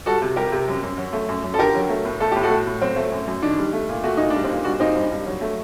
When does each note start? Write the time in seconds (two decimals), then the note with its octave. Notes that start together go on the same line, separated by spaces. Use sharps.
0.06 G3 F#4 A4
0.22 C3
0.36 G3 G4 A#4
0.52 C3
0.68 F#2
0.83 F#2
0.97 F#3
1.13 A3
1.28 F#2
1.43 F#2
1.54 A4
1.59 D3 G4 A#4
1.75 F#3
1.90 A3
2.05 A2
2.20 A3 A4
2.32 A2 G4
2.43 F#4 A4
2.50 A2
2.67 A2
2.81 F#3 C4
2.96 A3
3.12 F#2
3.27 F#2
3.42 D#3 D4
3.58 G3
3.73 A3
3.89 A#2
4.03 A3 F#4
4.17 A#2 D#4
4.30 G3 D4
4.44 C4 D#4
4.50 A#2
4.64 G3 D4 F#4
4.80 A#2 C4 D#4
4.95 G2
5.11 G2
5.26 F#3
5.41 A3